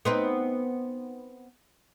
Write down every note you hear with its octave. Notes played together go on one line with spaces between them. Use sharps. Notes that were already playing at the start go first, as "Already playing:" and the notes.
B3 C4 D#4